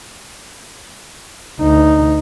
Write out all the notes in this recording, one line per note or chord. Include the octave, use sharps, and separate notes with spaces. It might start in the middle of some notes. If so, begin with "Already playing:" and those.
D2 D#4